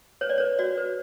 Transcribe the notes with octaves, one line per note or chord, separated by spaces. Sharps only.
B4 C#5
D5
B4 C#5
F#4 D5
B4